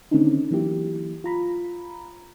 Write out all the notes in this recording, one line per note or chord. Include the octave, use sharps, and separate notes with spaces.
D3 D#3 A3 C4 C#4 D#4
E3 F#3 A#3 E4 G4
F4 A#5 B5